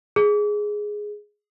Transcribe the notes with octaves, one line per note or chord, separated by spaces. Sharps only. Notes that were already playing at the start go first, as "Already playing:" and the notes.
G#4